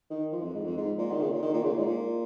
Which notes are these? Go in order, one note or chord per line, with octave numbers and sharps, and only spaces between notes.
D#3
F3
F2
G#2
F2
G#2
A#2
D#3
C#3
A#2
D#3
A#2
C#3
A#2
G#2
A#2